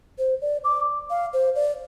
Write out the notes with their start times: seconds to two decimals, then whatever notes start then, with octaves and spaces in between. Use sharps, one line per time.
0.19 C5
0.41 D5
0.64 D6
1.10 F5
1.33 C5
1.55 D5